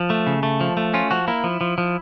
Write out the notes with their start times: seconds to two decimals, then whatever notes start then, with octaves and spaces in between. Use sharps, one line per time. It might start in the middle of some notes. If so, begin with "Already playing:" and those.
Already playing: F3
0.10 A3
0.27 C#3
0.43 A3
0.61 F3
0.77 A3
0.94 C#4 F4
1.11 F3 F#4
1.28 A#3 E4
1.44 F3
1.61 F3
1.78 F3